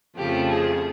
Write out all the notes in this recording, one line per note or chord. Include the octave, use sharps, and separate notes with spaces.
F2 C#3 F3 A3 G4
G#4